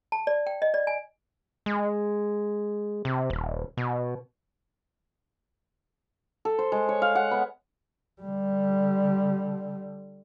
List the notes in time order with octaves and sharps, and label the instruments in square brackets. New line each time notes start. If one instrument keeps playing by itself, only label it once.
[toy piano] A5
D5
G5
D#5
D5
G#5
[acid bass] G#3
C3
D#1
B2
[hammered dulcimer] A4
C5
G#3
C#5
F5
F#5
B3
[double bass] D3 G3